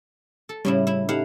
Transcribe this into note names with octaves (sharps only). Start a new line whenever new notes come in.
A4
A2 C#3 G3 C#4 E4
E4
D#4 E4 G4 A4 F5 F#5